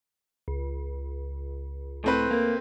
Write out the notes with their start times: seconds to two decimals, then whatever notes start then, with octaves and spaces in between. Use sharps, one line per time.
0.48 C#2
2.04 A2 A3 C4 B4
2.31 A#3